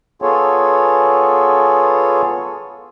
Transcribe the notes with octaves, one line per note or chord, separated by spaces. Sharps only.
B3 F4 G#4 A4 C#5